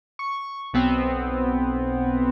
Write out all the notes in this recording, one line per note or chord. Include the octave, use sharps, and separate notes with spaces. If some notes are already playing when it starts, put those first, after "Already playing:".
C#6
B1 B3 C4